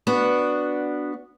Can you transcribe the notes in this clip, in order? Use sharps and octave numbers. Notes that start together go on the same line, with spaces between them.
B3 D4 F#4